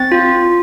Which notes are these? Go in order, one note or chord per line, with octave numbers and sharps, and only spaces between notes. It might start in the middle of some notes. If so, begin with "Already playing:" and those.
Already playing: C4 A6
F4